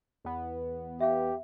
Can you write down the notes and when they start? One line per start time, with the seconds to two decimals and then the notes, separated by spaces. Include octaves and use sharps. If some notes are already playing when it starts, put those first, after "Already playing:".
0.24 E2 B3
1.00 G4 E5 F5